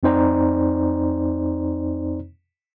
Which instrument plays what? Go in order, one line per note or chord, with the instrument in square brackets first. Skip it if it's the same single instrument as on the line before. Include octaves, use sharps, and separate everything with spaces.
[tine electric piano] F2 C4 D#4 C5 D5 A#5